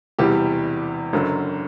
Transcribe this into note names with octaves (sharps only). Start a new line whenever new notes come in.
E1 E2 C3 E3 G3 G4
F#1 F#2 D3 F#3